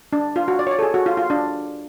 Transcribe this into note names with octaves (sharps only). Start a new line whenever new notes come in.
D4
F4
F#4
D5
C#5
D5
A4
G#4
F#4
F4
F4
D4